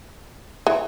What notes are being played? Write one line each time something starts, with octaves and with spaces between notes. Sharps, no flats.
E3